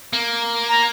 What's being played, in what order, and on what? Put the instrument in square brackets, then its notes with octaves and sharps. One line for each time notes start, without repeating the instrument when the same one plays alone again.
[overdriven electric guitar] A#3
[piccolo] A#5